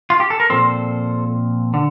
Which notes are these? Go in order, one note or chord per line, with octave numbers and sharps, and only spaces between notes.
F4
G4
A4
A#4
A#2 F3 C4 A4 C5
D3